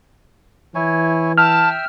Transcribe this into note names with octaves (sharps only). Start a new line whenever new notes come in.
E3 E4 C#5 G#5
E5 G5 A5 E6 F6